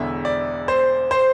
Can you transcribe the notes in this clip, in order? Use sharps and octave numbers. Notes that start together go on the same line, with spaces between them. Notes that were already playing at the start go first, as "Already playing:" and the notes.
Already playing: E1 E2 D3 E5
D5
C5
C5